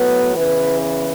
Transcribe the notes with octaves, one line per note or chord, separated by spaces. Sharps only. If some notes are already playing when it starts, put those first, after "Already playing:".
Already playing: A2 F#3 B3 B4
E2 C#3 E3 B4
B4